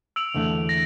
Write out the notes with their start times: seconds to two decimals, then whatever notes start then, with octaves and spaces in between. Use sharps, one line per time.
0.16 E6 D7 F7
0.34 E2 D3 A3
0.69 A#6